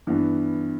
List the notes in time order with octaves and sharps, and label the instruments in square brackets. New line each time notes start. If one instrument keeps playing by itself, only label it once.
[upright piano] G2 E3 B3